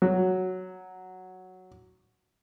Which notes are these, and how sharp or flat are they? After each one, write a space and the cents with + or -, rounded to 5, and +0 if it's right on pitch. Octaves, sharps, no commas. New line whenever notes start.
F#3 +0